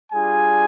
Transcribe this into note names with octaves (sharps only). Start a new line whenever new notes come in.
G3 D4 F4 G#4 G#5